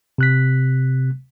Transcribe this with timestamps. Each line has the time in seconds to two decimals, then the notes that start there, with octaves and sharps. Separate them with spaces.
0.18 C3 F#6 B6